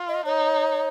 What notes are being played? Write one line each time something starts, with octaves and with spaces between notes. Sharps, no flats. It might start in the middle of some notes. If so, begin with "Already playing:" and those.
Already playing: F4
D#5
D#4 C#5